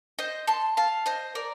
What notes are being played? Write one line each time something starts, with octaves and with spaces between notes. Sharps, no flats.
C5 D#5
A5 C6
F5 A5
C5 D#5
A#4 D5